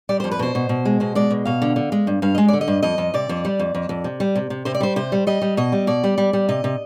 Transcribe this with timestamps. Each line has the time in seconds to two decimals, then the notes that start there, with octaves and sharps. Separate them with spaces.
0.09 G3 D5
0.20 F2 C5
0.31 B4
0.39 B2 C5
0.55 B2
0.69 B2
0.85 G#3
1.00 B2 C5
1.15 G#3 D5
1.30 B2
1.45 B2 F5
1.62 D3
1.76 D3
1.92 G#3
2.07 G2
2.22 G2 F5
2.35 G#3 D#5
2.48 D3 D5
2.61 D#5
2.68 G2
2.82 F2 D#5
2.98 F2
3.14 C3 D5
3.29 F2
3.45 G3
3.60 F2
3.75 F2
3.89 F2
4.04 C3
4.20 G3
4.36 C3
4.50 C3
4.65 C3 C5
4.74 D5
4.81 G3 C5
4.96 C3 C5
5.12 G3
5.27 G3 D#5
5.42 G3
5.57 B2 D#5
5.72 G3
5.87 B2 D5
6.04 G3
6.18 G3
6.33 G3
6.49 C3 D#5
6.64 C3